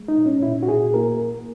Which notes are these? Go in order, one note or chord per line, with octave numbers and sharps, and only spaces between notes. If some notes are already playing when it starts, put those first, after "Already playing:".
Already playing: G#3
D#4
A#2
C#4
A#2 E4
F#4
A#2 G#4
A#3 A#4